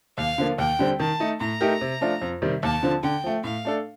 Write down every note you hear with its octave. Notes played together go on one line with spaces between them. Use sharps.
D#2 F5
D3 F3 A#3 F4
D#2 G5
D3 G3 C4
D#3 A5
A3 D#4
A2 A#5
A3 D#4 G4 A#4
C3
F3 A3 D4 F4
F2
C3 D#3 G3 C4
D#2 A5
D3 F3 C4
D3 G5
F3 A3
A2 F5
A3 D4 A4